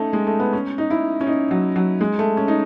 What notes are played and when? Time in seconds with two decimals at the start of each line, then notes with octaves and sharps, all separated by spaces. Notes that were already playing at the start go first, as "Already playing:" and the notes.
Already playing: A3 C#4 D#4
0.13 G#3
0.27 A3
0.40 B3
0.53 C#4
0.78 D#4
0.90 E4
1.21 C#4
1.27 D#4
1.51 F#3
1.76 F#3
2.01 G#3
2.19 A3
2.37 C#4
2.48 D#4